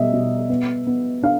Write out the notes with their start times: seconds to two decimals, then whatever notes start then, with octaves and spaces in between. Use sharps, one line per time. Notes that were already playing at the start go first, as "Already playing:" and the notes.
Already playing: B2 G3 D#5 E5
0.13 B2
0.49 B3
0.87 B3
1.23 D4 F5